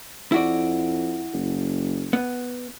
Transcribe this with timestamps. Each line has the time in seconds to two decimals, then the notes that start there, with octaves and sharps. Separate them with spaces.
0.32 F2 E4 F#4 D5
1.33 F#1
2.13 B3